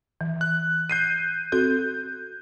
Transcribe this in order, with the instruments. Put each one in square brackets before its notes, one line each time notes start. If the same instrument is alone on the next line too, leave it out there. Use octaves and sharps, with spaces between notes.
[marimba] E3
[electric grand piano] F#6
G6 C7 D#7
[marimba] C4 F#4 A4 [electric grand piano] G6